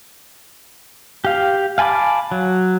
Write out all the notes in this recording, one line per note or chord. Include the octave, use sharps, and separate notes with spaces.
G4 F5
F5 G#5 A5 B5 D6
F#3